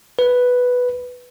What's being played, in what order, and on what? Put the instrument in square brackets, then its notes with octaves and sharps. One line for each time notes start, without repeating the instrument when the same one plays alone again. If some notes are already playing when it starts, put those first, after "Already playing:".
[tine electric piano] B4